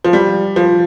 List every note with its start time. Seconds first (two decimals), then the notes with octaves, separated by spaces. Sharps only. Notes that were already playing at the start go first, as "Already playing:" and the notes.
0.04 F3
0.13 G3
0.56 F3